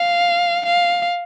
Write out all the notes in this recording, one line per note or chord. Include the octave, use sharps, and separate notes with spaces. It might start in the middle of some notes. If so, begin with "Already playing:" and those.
Already playing: F5
F5